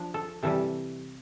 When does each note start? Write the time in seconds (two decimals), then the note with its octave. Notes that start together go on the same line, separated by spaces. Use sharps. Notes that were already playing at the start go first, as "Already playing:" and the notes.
Already playing: F3 D4
0.14 A4
0.43 C3 E3 G3 A4